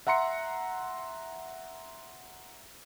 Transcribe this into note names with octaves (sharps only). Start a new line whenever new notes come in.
E5 F#5 A#5 C6 C#7